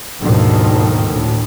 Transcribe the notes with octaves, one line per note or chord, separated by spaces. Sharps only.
D#2 G#2 B2 D3 D#3 F3
D2 A2